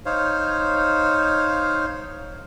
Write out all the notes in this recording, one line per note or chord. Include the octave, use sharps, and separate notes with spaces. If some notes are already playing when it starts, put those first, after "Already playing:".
D#4 C5 C#5 F5